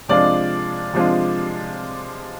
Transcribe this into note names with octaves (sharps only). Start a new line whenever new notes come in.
C3 F3 G#3 D4 F4 D5
C3 F3 G#3 D4 F4